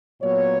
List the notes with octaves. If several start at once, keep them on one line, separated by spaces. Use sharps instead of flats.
A#2 F#3 B3 C#5